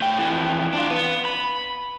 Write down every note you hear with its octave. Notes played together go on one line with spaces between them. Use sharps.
A3 G5
F2 E3
D4 F4
B3
B5